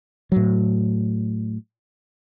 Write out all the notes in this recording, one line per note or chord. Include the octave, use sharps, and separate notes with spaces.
A2 F#3